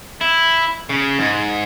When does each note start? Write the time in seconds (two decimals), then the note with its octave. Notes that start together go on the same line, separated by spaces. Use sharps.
0.21 E4
0.89 C#3
1.19 G#2